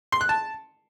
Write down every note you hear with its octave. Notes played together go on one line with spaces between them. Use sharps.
C6
F#6
A5